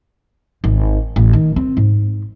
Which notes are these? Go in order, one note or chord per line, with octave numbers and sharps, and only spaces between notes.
G#1
A1
D#3
C4
G#2